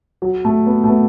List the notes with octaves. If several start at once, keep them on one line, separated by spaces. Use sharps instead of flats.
F#3
A3
B3
A3
B3